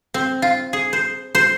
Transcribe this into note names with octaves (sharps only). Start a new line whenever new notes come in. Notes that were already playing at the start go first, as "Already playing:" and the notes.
C4
F4
G#4
C5
C5